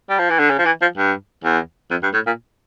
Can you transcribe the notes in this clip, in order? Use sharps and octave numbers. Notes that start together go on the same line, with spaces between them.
G3
F3
E3
D3
C#3
F3
E3
F3
G2
E2
F2
G2
A2
A#2